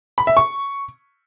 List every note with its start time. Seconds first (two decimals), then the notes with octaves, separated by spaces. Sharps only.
0.18 B5
0.27 E5
0.37 C#6